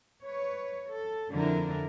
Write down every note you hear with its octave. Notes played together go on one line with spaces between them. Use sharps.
B4 C#5
A4
F2 D3 D4 E4 A#4